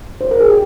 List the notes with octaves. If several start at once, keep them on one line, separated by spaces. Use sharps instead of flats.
C5
A#4
G#4
G4